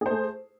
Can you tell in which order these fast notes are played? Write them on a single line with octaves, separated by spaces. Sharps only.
G#4 C5 A3